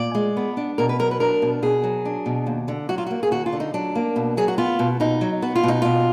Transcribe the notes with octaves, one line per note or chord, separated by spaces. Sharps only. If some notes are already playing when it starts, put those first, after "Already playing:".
Already playing: A#2 D5
G#3
B3
D4
B2 A#4
B4
F#3 A#4
B4
D4 A#4
B2
B2 G#4
F#3
D4
B2
D#2
D3
F#3 F#4
F4
A#3 F#4
G#4
D#2 F#4
F4
D3
D#4
F#3 D4
A#3
B2
F#3 G#4
F#4
B3 F4
B2
B2 D#4
F#3
B3 F#4
F4
B2 D#4
B2 F4